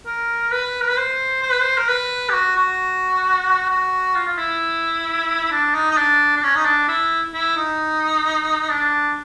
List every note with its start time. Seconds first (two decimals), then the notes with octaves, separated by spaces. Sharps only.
0.06 A#4
0.52 B4
0.82 A#4
0.89 B4
0.97 C5
1.43 C5
1.51 B4
1.61 C5
1.78 A#4
1.88 B4
2.29 G4
2.34 F#4
2.56 F#4
3.70 F#4
4.15 F4
4.27 F4
4.38 E4
5.52 D4
5.74 D#4
5.91 D#4
5.97 D4
6.36 D4
6.43 C#4
6.55 D#4
6.65 D4
6.88 E4
7.34 E4
7.56 D#4
8.69 D4